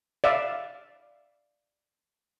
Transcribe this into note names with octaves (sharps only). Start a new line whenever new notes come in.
D5 E5 F5